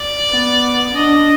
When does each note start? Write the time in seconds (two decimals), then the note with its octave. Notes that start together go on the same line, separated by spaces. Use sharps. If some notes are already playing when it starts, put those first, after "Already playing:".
Already playing: D5
0.31 B3
0.95 D4 D#5